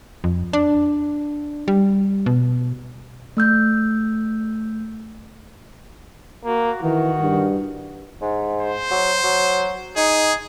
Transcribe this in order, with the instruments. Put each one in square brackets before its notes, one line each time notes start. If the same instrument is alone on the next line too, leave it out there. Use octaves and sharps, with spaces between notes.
[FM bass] F2
D4
G3
B2
[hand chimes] A3 E6 G6
[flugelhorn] A#3 [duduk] F#4
[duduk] D#3 [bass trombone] E3 [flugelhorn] F#4
[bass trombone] G2
[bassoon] G#2
[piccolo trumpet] C5
[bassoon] F#3
F#3
[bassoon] D#4 [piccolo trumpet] G#4